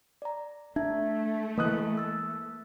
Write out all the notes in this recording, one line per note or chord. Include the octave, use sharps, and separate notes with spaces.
D5 A#5
A3 D4 E5 G#6
E3 A#3 D#5 D#6 F#6
E6 A6